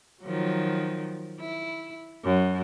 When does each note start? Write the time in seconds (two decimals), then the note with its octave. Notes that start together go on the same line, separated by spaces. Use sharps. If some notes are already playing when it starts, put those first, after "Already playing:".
0.23 D#3 F3 F#3
1.40 E4
2.24 F#2